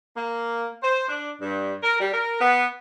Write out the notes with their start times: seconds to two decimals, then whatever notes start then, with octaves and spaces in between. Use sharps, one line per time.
0.16 A#3
0.83 C5
1.08 D4
1.40 G2
1.82 A#4
2.00 G3
2.12 A#4
2.40 B3